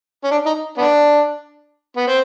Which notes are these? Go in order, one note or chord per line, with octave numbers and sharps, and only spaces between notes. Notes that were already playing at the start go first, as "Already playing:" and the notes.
C#4
D4
D#4
B3 D4
B3
C4